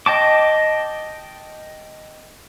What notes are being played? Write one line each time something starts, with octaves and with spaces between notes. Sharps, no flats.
D#5 G5 A5 D6